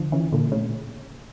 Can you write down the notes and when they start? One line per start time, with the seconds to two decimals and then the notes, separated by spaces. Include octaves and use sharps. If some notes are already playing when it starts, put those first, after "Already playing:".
Already playing: D3 F3
0.12 C#3 E3
0.32 A#2 D3
0.52 A2 C#3